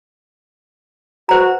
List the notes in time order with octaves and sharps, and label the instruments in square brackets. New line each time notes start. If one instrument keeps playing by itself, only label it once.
[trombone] F#4 [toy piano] B4 C5 A#5